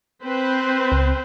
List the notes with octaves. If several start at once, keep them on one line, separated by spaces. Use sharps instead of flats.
C4 B4 C5
C#2